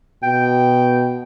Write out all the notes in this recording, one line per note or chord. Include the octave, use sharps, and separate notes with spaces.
B2 G5